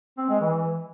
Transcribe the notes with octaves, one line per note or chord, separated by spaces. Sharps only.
C4
G#3
E3